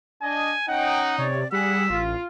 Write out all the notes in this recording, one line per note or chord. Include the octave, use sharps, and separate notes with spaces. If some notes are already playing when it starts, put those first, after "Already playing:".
D4 D#5 G#5
C#4 D#4 F#5 G5
C3 C#5 D5
G3 G#4 F#5 E6 B6
A1 F4